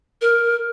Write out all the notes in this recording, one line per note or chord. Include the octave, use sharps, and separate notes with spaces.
A#4